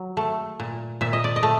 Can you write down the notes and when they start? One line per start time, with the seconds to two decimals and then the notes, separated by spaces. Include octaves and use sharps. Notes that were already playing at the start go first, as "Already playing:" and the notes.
Already playing: F#3
0.17 A3
0.60 A#2
1.01 A#2 E5
1.13 D#5
1.24 D5
1.36 D#5
1.43 A3